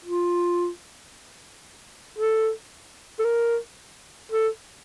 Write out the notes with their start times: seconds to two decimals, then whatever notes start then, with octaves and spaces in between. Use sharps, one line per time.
0.05 F4
2.18 A4
3.19 A4
3.25 A#4
4.32 A4